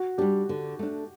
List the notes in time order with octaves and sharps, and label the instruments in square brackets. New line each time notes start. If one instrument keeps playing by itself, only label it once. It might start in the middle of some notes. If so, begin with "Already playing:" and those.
Already playing: [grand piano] F#4
[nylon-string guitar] G3 D4 [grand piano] G4
[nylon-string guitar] D3
A3 D4